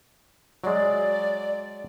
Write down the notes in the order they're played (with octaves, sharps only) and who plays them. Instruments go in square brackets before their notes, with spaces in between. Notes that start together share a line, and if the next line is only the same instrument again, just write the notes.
[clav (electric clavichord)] F#3 G#3 [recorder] D5